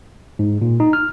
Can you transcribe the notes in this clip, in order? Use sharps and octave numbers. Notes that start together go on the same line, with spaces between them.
G#2
A#2
D#4
F6